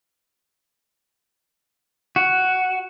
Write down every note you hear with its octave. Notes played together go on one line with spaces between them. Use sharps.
F#4